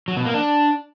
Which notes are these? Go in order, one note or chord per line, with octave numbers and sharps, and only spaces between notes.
F#3
B2
A#3
D4